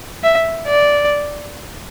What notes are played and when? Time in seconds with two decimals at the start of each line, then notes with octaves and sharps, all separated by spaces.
0.24 E5
0.67 D5